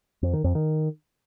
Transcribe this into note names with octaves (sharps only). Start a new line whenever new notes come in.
F2
D#3
F2
D#3